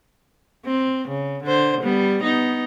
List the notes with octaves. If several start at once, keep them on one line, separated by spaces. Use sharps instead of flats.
C4
C#3
D3 C5
G3 B3
B3 D#4